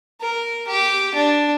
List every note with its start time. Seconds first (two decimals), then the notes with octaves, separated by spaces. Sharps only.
0.20 A#4
0.67 G4
1.14 D4